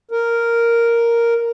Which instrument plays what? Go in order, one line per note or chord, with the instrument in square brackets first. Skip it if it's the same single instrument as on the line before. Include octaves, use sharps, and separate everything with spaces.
[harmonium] A#4